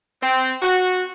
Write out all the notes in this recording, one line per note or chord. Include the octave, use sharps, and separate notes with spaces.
C4
F#4